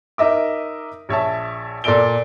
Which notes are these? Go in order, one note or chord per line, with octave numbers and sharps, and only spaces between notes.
D#4 A#4 D#5 E5 D6
A#1 C#5 E5 A5
A#2 A4 D5 E6 D7 G7